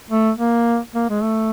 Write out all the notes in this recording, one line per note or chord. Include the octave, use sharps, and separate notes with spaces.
A3
A#3
A#3
G#3
A3